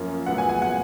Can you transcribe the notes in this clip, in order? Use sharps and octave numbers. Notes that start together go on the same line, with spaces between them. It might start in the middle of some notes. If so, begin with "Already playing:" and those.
Already playing: F#2 F3 A#3 C#4
A#2 F#3 B3 F#5
G#5
G#5
F#5